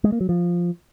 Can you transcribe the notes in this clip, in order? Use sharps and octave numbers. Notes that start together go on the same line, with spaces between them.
G#3
A#3
F#3
F3